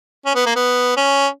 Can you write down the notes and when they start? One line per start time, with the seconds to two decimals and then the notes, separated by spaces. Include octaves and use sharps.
0.25 C#4
0.35 B3
0.46 A#3
0.56 B3
0.97 C#4